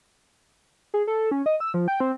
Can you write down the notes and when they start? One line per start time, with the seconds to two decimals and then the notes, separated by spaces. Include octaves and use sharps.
0.94 G#4
1.07 A4
1.31 C#4
1.46 D#5
1.60 E6
1.74 F3
1.88 G5
2.00 C4